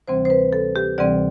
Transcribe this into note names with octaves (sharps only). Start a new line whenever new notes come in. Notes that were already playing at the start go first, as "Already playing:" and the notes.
D2 C3 E3 G3 C4 C5
C5
B4
A4
G4
D2 C3 E3 G3 C4 D5